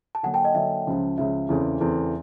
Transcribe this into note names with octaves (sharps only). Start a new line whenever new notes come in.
A5
D3 F#3 A#3 F#5 G#5
G5 A5
D#5
D3 F#3 A#3 E5
C#2 C#3 F3
C#2 C#3 F3 E5
E2 C#3 E3 A3 C4
E2 C#3 E3 A3 C4